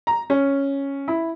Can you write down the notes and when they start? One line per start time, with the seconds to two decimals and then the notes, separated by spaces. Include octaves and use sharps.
0.07 A#5
0.30 C#4
1.08 E4